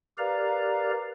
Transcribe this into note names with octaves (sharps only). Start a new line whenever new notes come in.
G4 A#4 B4 D5 F5 A#5